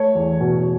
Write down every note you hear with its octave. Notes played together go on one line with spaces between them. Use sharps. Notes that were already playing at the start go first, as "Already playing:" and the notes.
Already playing: A3 C#5
E2
B2